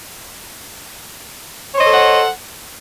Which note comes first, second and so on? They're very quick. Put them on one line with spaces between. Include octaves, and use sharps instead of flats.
C#5 C5 D#5 A4 F#5